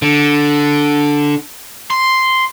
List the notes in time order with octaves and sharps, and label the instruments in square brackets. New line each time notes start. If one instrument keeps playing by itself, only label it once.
[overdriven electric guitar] D3
C6